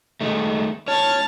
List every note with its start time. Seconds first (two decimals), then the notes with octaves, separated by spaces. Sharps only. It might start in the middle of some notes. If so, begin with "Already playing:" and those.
0.21 D#3 G#3 A3
0.88 C#5 A5 F6